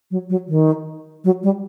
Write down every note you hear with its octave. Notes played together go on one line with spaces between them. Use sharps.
F#3
F#3
D#3
F#3
G3